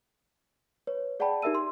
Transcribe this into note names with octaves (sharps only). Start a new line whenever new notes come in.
B4 C#5
G#4 D5 F#5 G5 A5 B5
D#4 G4 A#4 E5 E6 D#7
C6